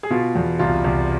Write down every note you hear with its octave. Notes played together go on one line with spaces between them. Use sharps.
G#4
B2 F4
E2
C2 F4
C2